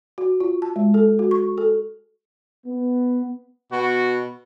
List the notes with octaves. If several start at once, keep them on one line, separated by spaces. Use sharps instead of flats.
F#4
F4
A5
G#3
A4
F#4
C#6
A4
B3
B2 F#4